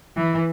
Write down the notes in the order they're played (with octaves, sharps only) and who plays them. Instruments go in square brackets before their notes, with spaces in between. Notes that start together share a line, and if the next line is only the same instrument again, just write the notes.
[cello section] E3